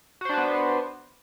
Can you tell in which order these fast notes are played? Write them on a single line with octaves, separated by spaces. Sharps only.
F#4 C5 D4 B4 B3